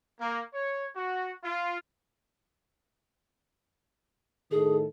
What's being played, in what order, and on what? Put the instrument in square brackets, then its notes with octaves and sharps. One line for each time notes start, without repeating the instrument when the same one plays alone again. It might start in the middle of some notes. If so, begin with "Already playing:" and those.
[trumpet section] A#3
C#5
F#4
F4
[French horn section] A2 D#3 A4 [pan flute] G#4